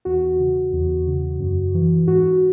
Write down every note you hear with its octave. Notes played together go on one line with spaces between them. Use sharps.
E2 F#4
C#3
E2
C#3
F#2
E3
G#2 F#4